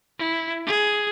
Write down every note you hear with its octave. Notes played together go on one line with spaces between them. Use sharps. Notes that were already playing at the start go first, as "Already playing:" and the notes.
E4
G#4